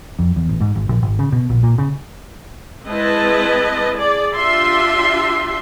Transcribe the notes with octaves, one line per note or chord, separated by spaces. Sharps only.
F2
E2
A1
G#2
G#1
A#1
G#1
C#3
B2
A#1
A#2
C#3
G#3 C4 E4 B4 D#5 A5
G#4 D5
D4 F4 G4 E5 C6